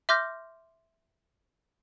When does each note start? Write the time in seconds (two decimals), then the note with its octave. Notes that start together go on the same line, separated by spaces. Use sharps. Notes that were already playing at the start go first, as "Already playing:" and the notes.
0.09 E5 C6 D6 F6 G6 A#6